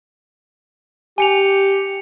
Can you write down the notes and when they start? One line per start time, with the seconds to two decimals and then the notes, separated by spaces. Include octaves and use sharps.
1.18 G4 G#5 C#7 F7